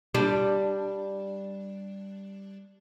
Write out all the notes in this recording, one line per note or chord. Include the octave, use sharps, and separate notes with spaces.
G3 D4